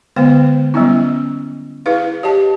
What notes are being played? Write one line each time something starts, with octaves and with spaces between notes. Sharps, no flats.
D3 G#3 B3 C5 G5
F#3 G3 B3 C#4 E4
E4 G#4 B4 F5
G4 C#5 D#5 A5